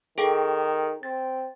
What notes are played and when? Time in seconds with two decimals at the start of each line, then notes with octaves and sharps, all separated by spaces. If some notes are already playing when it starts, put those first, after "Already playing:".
0.18 D#3 G#4 A4 G5
1.03 C4 A6